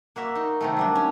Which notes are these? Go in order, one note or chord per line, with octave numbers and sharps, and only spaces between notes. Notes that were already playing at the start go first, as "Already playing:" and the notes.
A#3 F#4 E5
D#4
C3 D#3 A3
F#3 G3 D4
C#4